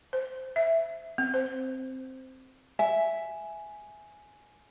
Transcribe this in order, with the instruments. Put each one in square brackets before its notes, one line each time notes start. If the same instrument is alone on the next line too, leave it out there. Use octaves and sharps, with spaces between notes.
[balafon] C5
E5
C4
C5
[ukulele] E5 [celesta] G#5